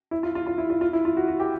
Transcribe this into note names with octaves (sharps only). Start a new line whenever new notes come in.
E4
F4
F4
F4
E4
F4
F4
E4
F4
F#4
F#4
G4